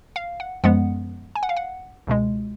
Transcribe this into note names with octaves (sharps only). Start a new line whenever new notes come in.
F5
F#5
F#2 F3 G#3 B3 F#5
G#5
F#5
F5
F#5
C#2 B2 G#3